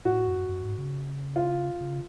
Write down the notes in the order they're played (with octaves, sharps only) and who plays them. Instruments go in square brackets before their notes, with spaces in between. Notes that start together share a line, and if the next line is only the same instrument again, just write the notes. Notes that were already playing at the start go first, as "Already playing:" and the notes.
[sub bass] A2 [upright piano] F#4
[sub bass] F#2
F#2
G#2
C#3
[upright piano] F4
[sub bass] C#3